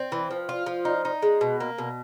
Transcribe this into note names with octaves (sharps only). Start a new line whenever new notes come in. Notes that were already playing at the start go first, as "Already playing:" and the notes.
Already playing: C4
E3
F3
F4
F3
D#4
D#4
G#3
B2
A#3
B2